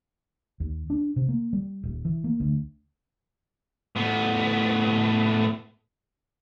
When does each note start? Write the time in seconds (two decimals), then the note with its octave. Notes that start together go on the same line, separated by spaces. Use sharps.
0.60 D#2
0.90 D4
1.16 C3
1.29 A#3
1.53 G3
1.83 D#1
2.05 E3
2.24 A#3
2.40 D2
3.96 A2 B3